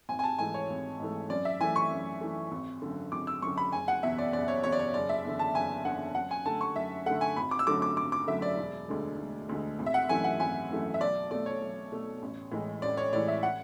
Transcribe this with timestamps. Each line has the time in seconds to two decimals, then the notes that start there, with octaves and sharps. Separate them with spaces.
0.09 G#1 G#5
0.19 G#5
0.24 A5
0.39 G#2 E3 A3 G#5
0.54 C#5
0.69 G#1
1.00 G#2 E3 A3
1.30 F#2 D5
1.45 E5
1.60 E3 A3 G#5
1.76 C#6
1.91 F#2
2.21 E3 A3
2.52 G#1
2.82 F#2 D3
3.12 G#1 D6
3.27 E6
3.42 F#2 D3 C#6
3.58 B5
3.72 F#1 G#5
3.88 F#5
4.03 E2 B2 E5
4.18 D5
4.33 F#1 D5
4.48 C#5
4.64 E2 B2 C#5
4.72 D5
4.79 C#5
4.94 F#1 D5
5.09 E5
5.24 E2 D3
5.39 A5
5.55 F#1 G#5
5.85 E2 D3 F#5
6.15 F#2 F#5
6.31 G#5
6.45 D3 A3 A5
6.61 C#6
6.76 F#2 E5
7.06 D3 A3 F#5
7.21 G#5
7.37 G#1 B5
7.51 D6
7.59 E6
7.67 F#2 D3 F#3 A3 D6
7.82 D6
7.97 G#1 D6
8.12 D6
8.27 F#2 D3 F#3 A3 E5
8.42 D5
8.57 E1
8.88 D2 D3 G#3
9.19 E1
9.49 D2 D3 G#3
9.79 G#1
9.86 E5
9.94 F#5
10.09 F#2 E3 A3 G#5
10.24 F#5
10.40 G#1 G#5
10.70 F#2 E3 A3
10.94 E5
11.01 B1 D5
11.31 B2 A3 D5
11.46 C#5
11.61 B1
11.92 B2 A3
12.22 A1
12.52 A2 E3 G#3
12.82 A1 D5
12.97 C#5
13.13 A2 E3 G#3 D5
13.28 E5
13.43 F#5